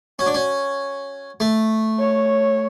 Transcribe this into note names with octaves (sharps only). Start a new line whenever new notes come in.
C#4 F#4
D4
C#4
A3
C#5